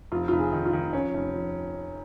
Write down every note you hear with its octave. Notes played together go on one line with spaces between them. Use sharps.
F1 F4
F1 F4
G#4
D#3
F4
D#3
F3 C#4
F1
F3